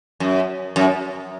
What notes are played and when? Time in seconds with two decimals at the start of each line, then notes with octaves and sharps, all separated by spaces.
0.20 F#2
0.76 F#2